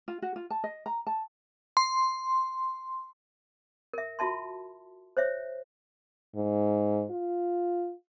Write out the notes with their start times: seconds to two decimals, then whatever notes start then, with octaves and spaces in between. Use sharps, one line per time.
0.08 F4
0.22 F#4
0.36 F4
0.50 A5
0.64 D#5
0.86 A#5
1.07 A5
1.77 C6
3.94 A#4 E5
4.19 F4 F#4 E5 A5 C6
5.17 C5 C#5 E5
6.36 G#2
7.10 F4